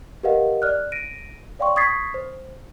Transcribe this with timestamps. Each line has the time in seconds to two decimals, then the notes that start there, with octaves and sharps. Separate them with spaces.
0.23 G4 A#4 B4 D#5 F5 F#5
0.62 D5 F6 F#6
0.92 A#6 D7 D#7
1.59 C#5 D5 F5 G5 C6 C#6
1.76 C#6 D#6 G#6 A6 B6 C7
2.14 C5